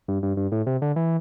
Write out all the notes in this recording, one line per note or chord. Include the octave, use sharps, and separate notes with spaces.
G2
G2
G2
A2
C3
D3
E3